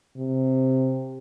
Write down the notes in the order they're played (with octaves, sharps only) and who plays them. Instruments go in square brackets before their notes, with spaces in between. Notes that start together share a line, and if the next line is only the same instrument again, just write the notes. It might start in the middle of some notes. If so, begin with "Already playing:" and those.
[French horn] C3